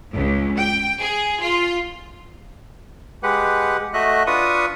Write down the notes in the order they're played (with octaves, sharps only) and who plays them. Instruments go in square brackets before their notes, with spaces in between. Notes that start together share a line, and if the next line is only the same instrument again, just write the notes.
[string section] C#2
G5
G#4
F4
[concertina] G#3 G4 B4 F#5
A3 F#4 D#5 E5 F#6
D4 F4 B4 C#6 D#6